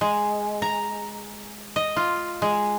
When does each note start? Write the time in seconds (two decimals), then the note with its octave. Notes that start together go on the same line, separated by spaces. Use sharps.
0.01 G#3
0.62 A#5
1.76 D#5
1.96 F4
2.42 G#3